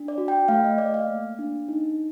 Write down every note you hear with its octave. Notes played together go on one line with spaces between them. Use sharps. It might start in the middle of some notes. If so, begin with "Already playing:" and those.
Already playing: D4
D5
F#4
G5
A3 F5
D#5
A3 D5
F5
A#3
D4
D#4